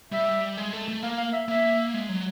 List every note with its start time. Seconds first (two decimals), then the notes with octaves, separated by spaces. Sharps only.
0.12 G3 E5
0.57 G#3
0.73 A3
0.88 A3
1.03 A#3 F5
1.18 F5
1.33 E5
1.48 A#3 E5
1.94 G#3
2.09 F#3